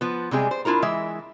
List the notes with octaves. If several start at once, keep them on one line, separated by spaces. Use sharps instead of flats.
F3 B3
C3 G3 G#3 G#4
C5
D4 E4 F4 A#4 A#5
E3 G#3 E5